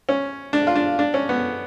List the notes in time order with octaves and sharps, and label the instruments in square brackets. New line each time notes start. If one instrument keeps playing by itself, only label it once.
[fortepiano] C#4
D4
F4
D4
D4
C#4
B3